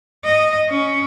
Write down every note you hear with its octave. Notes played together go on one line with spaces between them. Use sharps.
D#5
C#4